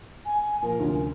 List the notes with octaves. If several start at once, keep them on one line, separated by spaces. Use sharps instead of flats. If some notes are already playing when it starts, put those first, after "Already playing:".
G#5
A#2 F3 A#4
F1 D2 C#4